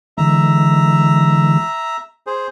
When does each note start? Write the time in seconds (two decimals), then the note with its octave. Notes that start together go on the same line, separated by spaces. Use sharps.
0.18 D3 E3 G#3 E5 A#5
2.27 G#4 C5